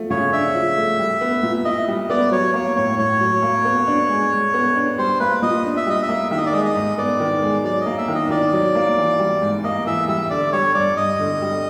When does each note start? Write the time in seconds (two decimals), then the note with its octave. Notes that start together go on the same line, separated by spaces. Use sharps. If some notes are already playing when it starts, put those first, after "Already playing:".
Already playing: F3 A3
0.10 C#3 C#5
0.32 D4 E5
0.55 F3
0.77 A3
0.99 G3
1.21 B3
1.43 A#2
1.65 E4 D#5
1.88 G3
2.10 B3 D5
2.32 F#3 C#5
2.54 A#3 C#5
2.76 A2 C#5
2.98 A2 C#5
3.21 F#3
3.43 A#3
3.65 B3
3.87 D4
4.09 G#3
4.32 G#3
4.54 B3
4.76 D4
4.98 G3 C5
5.20 A#3 B4
5.42 A#2 D#5
5.65 D4
5.77 E5
5.86 G3 D#5
6.03 E5
6.09 A#3
6.31 D#3 E5
6.38 D#5
6.46 D5
6.53 G#3 D#5
6.65 D#5
6.76 G#2
6.98 B3 D5
7.20 D#3
7.42 G#3
7.64 F#3 D5
7.81 D#5
7.86 A#3
7.98 E5
8.08 D#3
8.15 D#5
8.30 D#3 D5
8.53 F#3
8.75 A#3
8.98 E3
9.19 G3
9.42 G#2
9.64 A#3 D#5
9.86 E3 E5
10.08 G3 E5
10.30 D3 D5
10.52 G3 C#5
10.74 G2 D5
10.97 G2 D#5
11.19 D3
11.42 G3